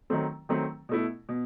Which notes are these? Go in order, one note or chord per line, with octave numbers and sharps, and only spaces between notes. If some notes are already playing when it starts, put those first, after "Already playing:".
D#3 F#3 A3 C4
D#3 F#3 A3 C4
B2 A3 E4
B2